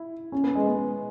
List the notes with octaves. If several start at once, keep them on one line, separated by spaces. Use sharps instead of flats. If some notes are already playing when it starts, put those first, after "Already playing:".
Already playing: E4
C#4
B3
G#3
B3